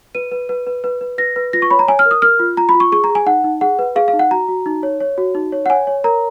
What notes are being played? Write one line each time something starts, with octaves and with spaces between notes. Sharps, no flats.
B4 D#7
B4
B4
B4
B4
B4
B4 A#6
B4
F4 A#6
C#6
C#5 B5
A#5
C#5 G#5
F6
A#4
D#6
A#4 F6
F4
F4 A#5
B5
F4
C#6
G#4 C#6
A#5
G#4
G#5
D#4 F#5
D#4
G#4 F#5
B4
G#4 F5
F5
D#4
F#5
F#4 A#5
F#4
D#4
C#5
C#5
F#4
D#4
C#5
F#5
C#5 G#5
C#5
A#4 A#5